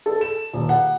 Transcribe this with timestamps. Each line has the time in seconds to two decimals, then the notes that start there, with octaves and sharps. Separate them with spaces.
0.06 A4
0.21 E7
0.53 D#1
0.69 F#5